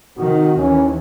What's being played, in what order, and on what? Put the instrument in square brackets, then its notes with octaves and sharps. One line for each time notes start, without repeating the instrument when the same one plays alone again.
[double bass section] C3 D#3 [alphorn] F#4
[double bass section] D#2 E3 [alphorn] C#4